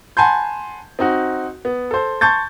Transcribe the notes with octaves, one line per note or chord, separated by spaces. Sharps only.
F#5 G#5 A5 B5 C6 G6
C4 D#4 F#4
B3
A4 C5
A5 C6 C#6 G6 A6